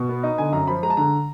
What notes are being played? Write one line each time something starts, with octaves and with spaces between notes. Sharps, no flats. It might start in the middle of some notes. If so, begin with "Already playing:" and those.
Already playing: B2
B3
D#4
D3 G#5
F#2 A#5
F3 B5
G#3 A#5
A5
D3 A#5